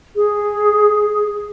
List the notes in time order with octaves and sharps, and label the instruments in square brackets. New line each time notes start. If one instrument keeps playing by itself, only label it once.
[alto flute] G#4